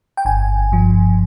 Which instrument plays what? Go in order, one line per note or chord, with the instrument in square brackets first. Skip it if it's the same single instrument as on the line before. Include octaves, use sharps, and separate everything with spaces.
[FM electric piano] G5
G1 G#5
G2 F3